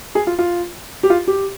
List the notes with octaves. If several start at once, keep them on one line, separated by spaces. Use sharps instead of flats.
G#4
F4
F4
G4
F4
G4